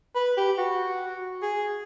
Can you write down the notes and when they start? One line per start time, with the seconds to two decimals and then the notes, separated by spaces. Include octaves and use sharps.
0.16 B4
0.37 G4
0.58 F#4
1.42 G#4